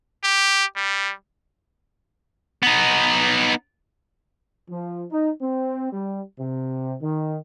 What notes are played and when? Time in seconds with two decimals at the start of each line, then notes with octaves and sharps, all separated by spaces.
0.24 G4
0.76 G3
2.63 B3 D#4
4.70 F3
5.11 D#4
5.42 C4
5.92 G3
6.39 C3
7.02 D#3